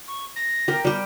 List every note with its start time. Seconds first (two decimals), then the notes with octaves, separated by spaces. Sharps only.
0.08 C#6
0.36 A#6
0.68 G4 A#4
0.85 G3 G4